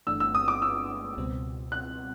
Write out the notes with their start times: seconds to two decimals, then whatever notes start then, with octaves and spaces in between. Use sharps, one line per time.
0.07 G1 G2 E3 A3 D4 E6
0.20 E6
0.35 D#6
0.48 D6
0.62 E6
1.17 C#2 B2 G3 C4
1.72 F#6